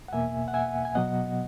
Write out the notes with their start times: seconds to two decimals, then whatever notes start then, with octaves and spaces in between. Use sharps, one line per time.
0.08 F#5
0.12 E2 B2 A#3 E5 G#5
0.48 F#5
0.54 E5 G#5
0.85 G#5
0.95 B2 F#3 B3 D#5 F#5